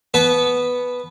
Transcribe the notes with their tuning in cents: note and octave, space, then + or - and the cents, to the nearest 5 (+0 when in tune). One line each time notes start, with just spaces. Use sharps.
B3 +0 B4 +0 A5 -35